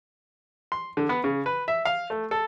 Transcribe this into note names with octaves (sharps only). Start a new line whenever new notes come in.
C6
D3
B3
C#3
B4
E5
F5
A3
A4